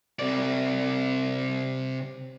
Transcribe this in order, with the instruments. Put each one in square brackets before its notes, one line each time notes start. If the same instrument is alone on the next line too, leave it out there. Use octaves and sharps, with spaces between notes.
[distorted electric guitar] C3 D5